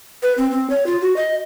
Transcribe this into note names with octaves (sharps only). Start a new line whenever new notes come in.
B4
C4
C4
C#5
F4
F#4
D#5